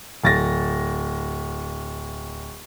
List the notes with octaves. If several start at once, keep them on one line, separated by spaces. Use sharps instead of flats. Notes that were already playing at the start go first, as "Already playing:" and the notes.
D1 A6 A#6